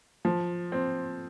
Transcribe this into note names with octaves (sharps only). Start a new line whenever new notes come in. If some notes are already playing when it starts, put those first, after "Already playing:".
F3
C4